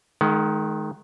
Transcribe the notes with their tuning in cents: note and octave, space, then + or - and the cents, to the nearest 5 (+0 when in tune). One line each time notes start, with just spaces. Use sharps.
D#3 +0 G#3 +35 F#5 +25